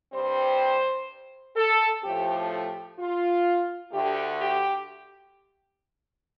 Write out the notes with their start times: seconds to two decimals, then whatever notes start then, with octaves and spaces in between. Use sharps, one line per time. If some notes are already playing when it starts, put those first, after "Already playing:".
0.13 G2 G3 C4 C5
1.57 A4
2.03 A2 F3 A3 C4 G4
2.51 G4
2.99 F4
3.93 D2 D3 A3 G4
4.40 G4